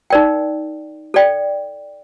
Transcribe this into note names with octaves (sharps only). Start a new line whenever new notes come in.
D#4 A#4 D5 G5
A4 D5 G5